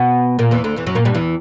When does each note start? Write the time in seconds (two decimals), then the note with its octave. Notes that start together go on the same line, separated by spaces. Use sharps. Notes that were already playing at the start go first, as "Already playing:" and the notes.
Already playing: B2 B3
0.39 A#2 A#3
0.51 E2 E3
0.64 D2 D3
0.76 E2 E3
0.86 F#2 F#3
0.95 A#2 A#3
1.05 G2 G3
1.15 E2 E3